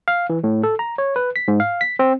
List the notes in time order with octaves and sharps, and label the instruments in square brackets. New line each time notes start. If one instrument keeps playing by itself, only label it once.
[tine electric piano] F5
E3
A2
A4
A#5
C#5
B4
B6
G#2
F5
B6
C4